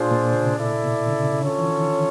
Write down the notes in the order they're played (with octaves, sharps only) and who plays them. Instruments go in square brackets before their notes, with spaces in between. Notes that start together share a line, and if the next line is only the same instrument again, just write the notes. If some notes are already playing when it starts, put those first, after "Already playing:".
Already playing: [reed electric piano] A#2 [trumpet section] D4 F4 G#4 C5
[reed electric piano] A#2
C#3
C3
[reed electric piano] B2 [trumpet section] E4 A4 D5
[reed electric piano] B2
D3
C#3
C#3
[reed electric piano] D3 [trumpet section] C#4 F4 A4 C#5
[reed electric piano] E3
D#3